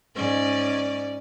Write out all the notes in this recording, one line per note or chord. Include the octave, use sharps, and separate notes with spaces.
G#2 C#4 D5